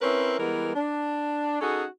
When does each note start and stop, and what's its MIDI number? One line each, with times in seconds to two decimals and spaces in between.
0.01 0.35 60
0.01 0.35 61
0.01 0.35 64
0.01 0.35 70
0.01 0.35 71
0.38 0.72 52
0.38 0.72 55
0.38 0.72 56
0.38 0.72 59
0.38 0.72 70
0.75 1.58 62
1.61 1.84 61
1.61 1.84 63
1.61 1.84 66
1.61 1.84 68
1.61 1.84 69